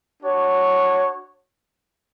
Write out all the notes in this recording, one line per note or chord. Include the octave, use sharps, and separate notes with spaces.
D4 F#4 C#5